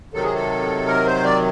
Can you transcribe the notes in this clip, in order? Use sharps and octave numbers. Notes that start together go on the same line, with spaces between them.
C3 D#3 F#3 A4
G#4
A4
A#4
C5
D5